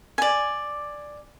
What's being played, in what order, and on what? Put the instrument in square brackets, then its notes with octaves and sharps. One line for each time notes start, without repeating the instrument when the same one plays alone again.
[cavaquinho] D5 G#5